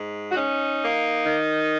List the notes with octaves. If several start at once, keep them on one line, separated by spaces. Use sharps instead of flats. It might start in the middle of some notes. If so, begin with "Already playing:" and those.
Already playing: G#2
F#4
C#4 D#4
A#3
D#3